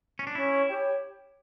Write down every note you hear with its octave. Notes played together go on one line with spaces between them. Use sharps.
C#4
D4
C#4 E4
G4 C#5 G5